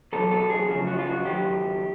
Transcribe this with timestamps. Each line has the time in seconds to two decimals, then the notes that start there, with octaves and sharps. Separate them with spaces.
0.13 E2 B2 F#3 A4
0.31 A4
0.50 G#4
0.69 F#2 C#3 F3
0.87 F#4
0.99 F4
1.06 F#4
1.24 G2 D#3 F#3 G4